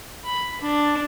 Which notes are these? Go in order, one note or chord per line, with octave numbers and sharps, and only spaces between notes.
B5
D4